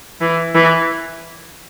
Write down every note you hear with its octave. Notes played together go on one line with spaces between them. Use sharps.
E3
E3